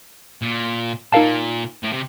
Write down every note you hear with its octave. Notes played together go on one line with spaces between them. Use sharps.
A#2
A#2 D#4 A#4 F5 A5
A2
C3